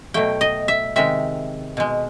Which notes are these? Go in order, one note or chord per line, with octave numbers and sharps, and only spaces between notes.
B2 F#3 A3 G5
D#5
E5
C3 D#3 G#3 E5
B2 G#3